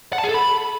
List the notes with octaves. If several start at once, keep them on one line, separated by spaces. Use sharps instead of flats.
F#5
A5
G#4
A4
B5